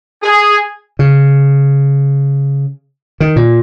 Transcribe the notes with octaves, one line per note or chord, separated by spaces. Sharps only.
G#4
C#3
D#3
A#2